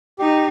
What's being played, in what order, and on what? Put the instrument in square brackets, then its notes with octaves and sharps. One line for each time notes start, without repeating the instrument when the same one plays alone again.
[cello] D#4 [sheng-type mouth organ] G4